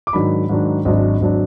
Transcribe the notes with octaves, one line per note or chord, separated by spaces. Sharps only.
D6
G#2 D#3 F#3 D4 B5
G#2 D#3 F#3 D4
G#1 G#2 F#3 D4 D#5
G#1 F#3 D4